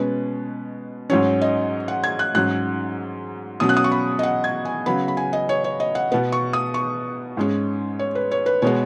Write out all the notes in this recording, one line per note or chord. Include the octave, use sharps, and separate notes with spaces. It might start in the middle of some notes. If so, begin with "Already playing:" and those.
Already playing: B2 G#3 C#4 B4
G#2 F#3 C#4 C#5
D#5
F#5
G#6
F#6
G#2 F#3 C#4 F#6
B2 F#3 C#4 D#6
F#6
D#6
C#6
B5
D#5
F#5
G#6
G#5
C#3 F#3 B3 B5
B5
G#5
D#5
C#5
C#5
D#5
F#5
B2 B3
C#6
D#6
C#6
G#2 G#3 C#4
C#5
B4
C#5
B4
B2 G#3 B3 C#5